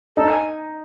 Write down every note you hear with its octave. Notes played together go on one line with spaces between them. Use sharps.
D#4 A4
G#5